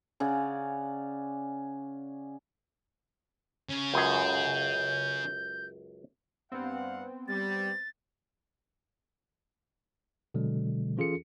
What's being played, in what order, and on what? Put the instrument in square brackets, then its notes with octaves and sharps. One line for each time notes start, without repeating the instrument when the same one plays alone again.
[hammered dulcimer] C#3 C#4 D5 F#5
[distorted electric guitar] C#3
[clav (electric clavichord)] C#2 F#2 G#4 [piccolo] G6
[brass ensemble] G2 F5 F#5 [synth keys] B3 C4
[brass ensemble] G3 [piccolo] A6
[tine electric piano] B2 D3 F#3 G#3
E3 C#4 F4 G#4 A4 C#7